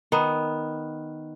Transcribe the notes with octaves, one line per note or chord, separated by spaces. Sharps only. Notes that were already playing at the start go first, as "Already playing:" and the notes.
D#3 B3